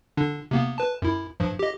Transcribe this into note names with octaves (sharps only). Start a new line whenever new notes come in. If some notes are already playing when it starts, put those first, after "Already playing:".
D3 D4
C3 A#3 B3
B4 A5
F#2 E4
G2 F3
G4 D#5